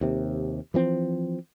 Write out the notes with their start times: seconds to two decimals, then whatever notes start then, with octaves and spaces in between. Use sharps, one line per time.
0.01 D#2 C3
0.74 E3 F3 C4